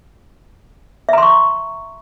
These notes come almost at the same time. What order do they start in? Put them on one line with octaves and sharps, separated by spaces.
E5 A#5 C6 C#6